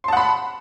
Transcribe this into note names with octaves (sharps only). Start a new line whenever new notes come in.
F#5 A5 B5 C6